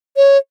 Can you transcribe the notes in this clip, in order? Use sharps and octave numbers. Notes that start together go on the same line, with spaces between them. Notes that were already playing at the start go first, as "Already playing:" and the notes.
C#5